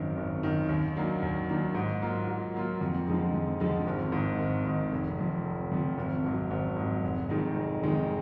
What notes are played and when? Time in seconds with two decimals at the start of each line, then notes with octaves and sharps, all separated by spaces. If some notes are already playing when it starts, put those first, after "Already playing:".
Already playing: G#1 F#2 D#3
0.17 G#1
0.43 F#2 D#3
0.69 D#2
0.96 D#3 F#3 A#3 D4
1.22 D#2
1.49 D#3 F#3 A#3 D4
1.75 G#2
2.02 F#3 A#3 F4
2.28 G#2
2.54 F#3 A#3 F4
2.81 F2
3.07 D3 F3 G#3 D#4
3.34 F2
3.60 D3 F3 G#3 D#4
3.87 G#1
4.12 G#2 D#3
4.39 G#1
4.66 G#2 D#3
4.92 F1
5.19 F2 F3
5.45 F1
5.71 F2 F3
5.98 G#1
6.24 G#2 F#3
6.51 G#1
6.77 G#2 F#3
7.03 F1
7.29 F2 D#3 G#3 D#4
7.56 F1
7.83 F2 D#3 G#3 D#4